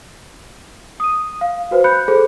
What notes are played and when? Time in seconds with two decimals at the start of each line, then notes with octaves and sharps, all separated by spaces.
1.00 D#6 D#7
1.41 F5
1.71 F#4 B4 C5
1.84 B5 F#6 G6 C#7
2.08 G#4 A4 C5